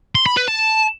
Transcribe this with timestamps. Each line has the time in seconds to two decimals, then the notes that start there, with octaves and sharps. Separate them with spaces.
0.15 C6
0.26 B5
0.37 B4
0.48 A5